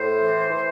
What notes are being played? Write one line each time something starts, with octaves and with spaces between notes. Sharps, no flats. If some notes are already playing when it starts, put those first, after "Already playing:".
Already playing: A2 C5
E3
E3